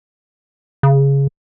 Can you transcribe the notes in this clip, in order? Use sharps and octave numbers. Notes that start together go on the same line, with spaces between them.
C#3